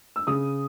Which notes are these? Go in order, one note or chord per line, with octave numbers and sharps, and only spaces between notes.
E6
C#3 D#6